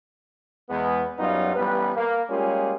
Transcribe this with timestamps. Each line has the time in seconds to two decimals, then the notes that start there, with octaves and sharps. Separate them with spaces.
0.70 E2 G#3 B3
1.18 F#2 F#3 G3 B3 D#4 F4
1.56 A1 G3 B3 B4
1.96 A#3
2.30 G3 G#3 A#3 C#4 F4 G#4